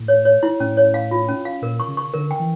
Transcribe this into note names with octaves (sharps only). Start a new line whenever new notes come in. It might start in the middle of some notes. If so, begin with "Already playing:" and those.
Already playing: A2
C#5
C#5
E4
A2 C#4
C#5
F5
F4
C#4
F5
A#2 A#4
C#6
C#3
C#6
D3 A#4
G5
E3